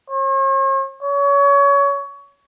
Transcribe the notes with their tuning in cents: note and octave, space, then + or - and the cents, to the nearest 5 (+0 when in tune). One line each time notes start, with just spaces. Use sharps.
C#5 -45
C#5 +25